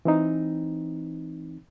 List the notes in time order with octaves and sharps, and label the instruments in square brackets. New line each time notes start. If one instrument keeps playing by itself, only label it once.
[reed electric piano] E3 C4 D#4